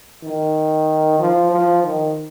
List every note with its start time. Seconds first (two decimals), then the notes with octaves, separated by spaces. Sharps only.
0.23 D#3
1.20 F3
1.51 F3
1.83 D#3